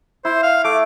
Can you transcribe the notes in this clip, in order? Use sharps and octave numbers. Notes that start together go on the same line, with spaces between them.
E4 C5
F5
A3 D6